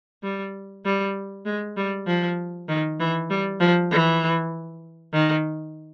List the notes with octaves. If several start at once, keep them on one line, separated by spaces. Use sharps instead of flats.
G3
G3
G#3
G3
F3
D#3
E3
G3
F3
E3
D#3